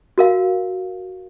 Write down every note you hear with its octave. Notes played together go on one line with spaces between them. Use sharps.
F#4 A#4 F5